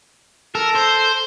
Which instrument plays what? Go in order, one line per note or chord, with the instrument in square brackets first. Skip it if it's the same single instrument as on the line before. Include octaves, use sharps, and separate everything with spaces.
[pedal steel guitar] A4 [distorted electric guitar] A#4
[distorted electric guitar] C5